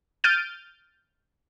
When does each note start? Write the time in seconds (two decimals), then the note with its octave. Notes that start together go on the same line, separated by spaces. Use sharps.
0.24 F6 G6 A6 D7 D#7